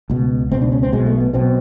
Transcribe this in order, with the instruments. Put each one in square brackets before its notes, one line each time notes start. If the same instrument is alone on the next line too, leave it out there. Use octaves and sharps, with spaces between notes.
[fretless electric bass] C#2 B2
C#2 C4
B2
D4
C#4
C4
B1 B2 G#3
A3
B3
B1 B2 C4